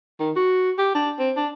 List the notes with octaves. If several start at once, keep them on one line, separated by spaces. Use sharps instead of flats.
D#3
F#4
G4
D4
C4
D4